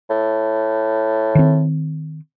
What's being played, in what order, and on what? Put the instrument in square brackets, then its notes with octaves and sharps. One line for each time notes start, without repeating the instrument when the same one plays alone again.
[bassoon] A2
[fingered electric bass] D#3 C4